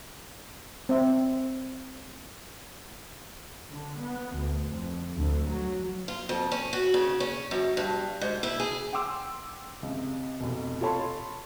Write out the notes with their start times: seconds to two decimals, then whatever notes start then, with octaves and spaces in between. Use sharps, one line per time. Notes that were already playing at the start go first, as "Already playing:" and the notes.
0.89 C4 E5
3.71 D3
4.00 B3
4.35 D2
4.69 F2
5.16 D2
5.47 F#3
6.08 F4
6.29 F2
6.52 C#4
6.73 F#4
6.94 C#3
7.20 C#4
7.51 F#2
7.77 G2
8.21 G#2
8.43 E4
8.60 G#4
8.92 F#5 G5 C6 D6 E6
9.83 C#2 C3
10.40 F1 B2
10.81 F4 A4 C#5 A5 B5 C6